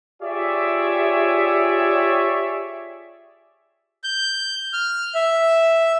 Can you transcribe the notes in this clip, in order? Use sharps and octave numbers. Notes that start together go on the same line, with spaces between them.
F4 G4 G#4 C#5 D5 E5
G6
F6
E5